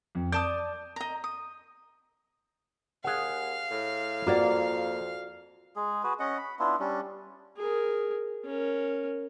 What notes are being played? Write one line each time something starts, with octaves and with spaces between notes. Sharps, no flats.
F2
D5 A5 D#6 G6
D#5 A#5
D#6
D#2 G#4 F5 F#5
A2
F2 A#3 F4 F#4 D5
G#3 G#4
F#4 G#4 B4
C#4 D#5 F#5
B5
B3 D4 E4 F4
G3 C#4 D4
G#4 A#4
C#4 A#4